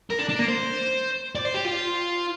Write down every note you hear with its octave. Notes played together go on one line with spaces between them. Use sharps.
A#4
D4
D4
A#3
C5
D5
C5
G4
F4